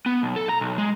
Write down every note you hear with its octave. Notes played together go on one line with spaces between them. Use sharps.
B3
B1
A4
A#5
B1
G#3